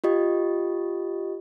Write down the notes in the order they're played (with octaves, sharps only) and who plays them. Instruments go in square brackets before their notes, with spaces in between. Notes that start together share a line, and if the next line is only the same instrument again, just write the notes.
[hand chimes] F4 G4 D#5